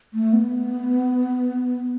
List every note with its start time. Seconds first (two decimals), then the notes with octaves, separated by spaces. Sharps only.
0.14 A3
0.33 B3